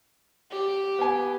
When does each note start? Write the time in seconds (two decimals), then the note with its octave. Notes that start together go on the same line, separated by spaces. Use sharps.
0.51 G4
0.99 B3 G#5